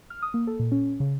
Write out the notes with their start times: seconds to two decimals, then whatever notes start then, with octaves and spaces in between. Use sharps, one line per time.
0.10 F6
0.22 D#6
0.34 A#3
0.47 A4
0.59 A#2
0.72 C#4
1.00 C#3